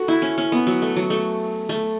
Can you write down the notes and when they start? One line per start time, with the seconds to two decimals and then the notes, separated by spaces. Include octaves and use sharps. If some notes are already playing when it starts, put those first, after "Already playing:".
Already playing: F#4 A4
0.08 E4
0.22 C#4
0.38 C#4
0.52 B3
0.67 F#3
0.82 A3
0.97 F#3
1.10 A3
1.69 A3